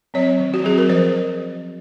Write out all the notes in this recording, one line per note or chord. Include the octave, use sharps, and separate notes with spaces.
F#3 C4 C#5
D#3
F#4
F#3 C4 G#4
A#4
F3 C5